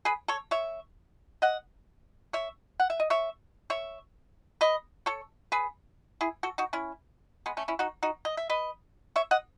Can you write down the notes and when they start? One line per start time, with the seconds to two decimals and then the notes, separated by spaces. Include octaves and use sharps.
0.05 G#4 B4
0.28 A4 C#5
0.51 C#5 E5
1.42 D#5 F#5
2.33 C#5 E5
2.80 F#5
2.90 E5
3.00 D#5
3.10 C#5 E5
3.70 C#5 E5
4.61 B4 D#5
5.06 A4 C#5
5.52 G#4 B4
6.21 E4 G#4
6.43 F#4 A4
6.58 D#4 F#4
6.73 C#4 E4
7.46 G#3 B3
7.57 A3 C#4
7.68 C#4 E4
7.79 D#4 F#4
8.03 D#4 F#4
8.25 D#5
8.37 E5
8.50 B4 D#5
9.16 C#5 E5
9.31 D#5 F#5